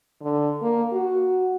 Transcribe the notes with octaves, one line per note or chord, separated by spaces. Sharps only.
D3
A#3
F#4